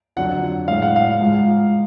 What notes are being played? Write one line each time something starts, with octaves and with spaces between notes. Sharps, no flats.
F2 D3 F#3 F#5
A2 G#3 F5
F#5
F5
G#2 F3 G#3